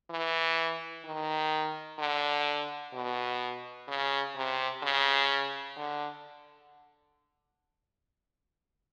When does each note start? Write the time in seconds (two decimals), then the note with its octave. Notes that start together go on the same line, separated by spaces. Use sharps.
0.11 E3
1.05 D#3
1.99 D3
2.94 B2
3.88 C#3
4.36 C3
4.83 C#3
5.77 D3